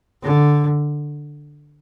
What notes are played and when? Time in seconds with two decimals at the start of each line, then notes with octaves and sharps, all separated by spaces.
0.23 D3